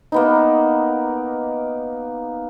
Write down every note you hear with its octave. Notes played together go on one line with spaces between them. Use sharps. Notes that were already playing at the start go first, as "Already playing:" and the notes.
A#3 B3 D#4